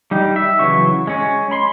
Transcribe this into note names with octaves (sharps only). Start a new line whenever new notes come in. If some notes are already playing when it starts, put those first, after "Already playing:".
G3 D#4 G4
E5
C#3 E3 F#3 C#6
G#3 C#4
B5 C6